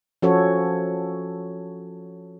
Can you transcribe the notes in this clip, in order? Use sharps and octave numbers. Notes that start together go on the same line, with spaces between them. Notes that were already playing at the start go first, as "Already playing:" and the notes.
F3 C#4 F#4 A4 C#5